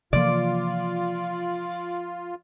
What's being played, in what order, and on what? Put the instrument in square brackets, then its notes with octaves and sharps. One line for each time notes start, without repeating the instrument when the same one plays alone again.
[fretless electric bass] C3 E3 A#3 [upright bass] F3 [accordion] F4 [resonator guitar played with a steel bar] D5